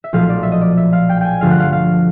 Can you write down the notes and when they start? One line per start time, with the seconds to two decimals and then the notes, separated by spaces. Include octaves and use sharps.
0.04 E5
0.13 B1 A#2 F3 A3 F5
0.29 D5
0.43 E5
0.52 D#5
0.61 D5
0.77 E5
0.93 F5
1.09 G5
1.21 G5 G#5
1.41 G2 D3 F3 A3 F5
1.50 F#5
1.60 F5
1.72 F5